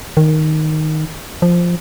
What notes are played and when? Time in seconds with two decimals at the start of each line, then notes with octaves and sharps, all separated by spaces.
0.17 D#3
1.42 F3